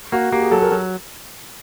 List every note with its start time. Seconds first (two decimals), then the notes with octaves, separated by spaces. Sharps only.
0.12 A#3 F#4
0.32 A#3 G4
0.42 G#4
0.51 F#3 A4
0.62 A#4
0.72 F#3